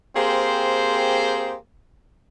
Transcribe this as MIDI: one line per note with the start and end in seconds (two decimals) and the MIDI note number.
0.16 1.55 58
0.16 1.55 60
0.16 1.55 67
0.16 1.55 68
0.16 1.55 72